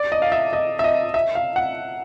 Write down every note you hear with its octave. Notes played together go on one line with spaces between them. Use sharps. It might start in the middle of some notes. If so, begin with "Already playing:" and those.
Already playing: D5
D#5
F5
E5
D#5
E5
D#5
E5
F5
F#5